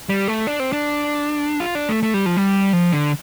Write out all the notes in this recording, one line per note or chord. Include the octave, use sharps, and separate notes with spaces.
G3
A3
D4
C4
D4
F4
D4
A3
A3
G3
F3
G3
F3
D3